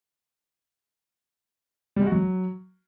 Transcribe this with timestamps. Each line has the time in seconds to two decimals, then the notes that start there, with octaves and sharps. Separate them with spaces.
1.96 G3
2.02 G#3
2.07 F#4
2.12 F#3